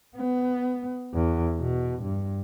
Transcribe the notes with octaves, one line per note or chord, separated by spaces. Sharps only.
B3
E2
B2
G2